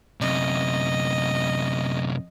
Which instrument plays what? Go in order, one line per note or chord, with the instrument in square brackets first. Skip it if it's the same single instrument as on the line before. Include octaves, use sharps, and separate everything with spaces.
[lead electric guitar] F#2 C3 [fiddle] D#5